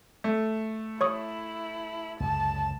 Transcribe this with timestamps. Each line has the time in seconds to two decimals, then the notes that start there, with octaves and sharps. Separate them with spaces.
0.24 A3
1.01 E4 C#5 C#6 D#6
2.20 C#2 F#2 D3 A5